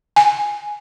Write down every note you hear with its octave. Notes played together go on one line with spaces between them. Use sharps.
G#5